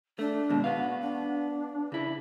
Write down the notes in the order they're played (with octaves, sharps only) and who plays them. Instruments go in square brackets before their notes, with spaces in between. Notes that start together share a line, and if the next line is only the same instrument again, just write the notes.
[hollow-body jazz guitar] A3 [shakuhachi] D4
[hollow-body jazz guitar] D#2 G#2 B2
[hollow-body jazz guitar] B3 F5 [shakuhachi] F#4
[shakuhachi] D4
[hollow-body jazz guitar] C#3 E4